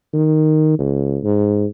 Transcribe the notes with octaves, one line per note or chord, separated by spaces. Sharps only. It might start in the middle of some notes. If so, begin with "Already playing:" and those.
D#3
C#2
G#2